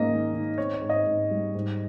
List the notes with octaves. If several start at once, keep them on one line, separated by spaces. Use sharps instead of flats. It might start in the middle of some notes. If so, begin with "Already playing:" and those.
Already playing: G#2 A#3 C#4 D#5
D#3
D#3
C4 C#5
C#5
G#2
D#5
G#2
G3
G#2